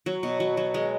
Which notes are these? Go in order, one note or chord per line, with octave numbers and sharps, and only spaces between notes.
F#3
B2
F#3
F#3
G#3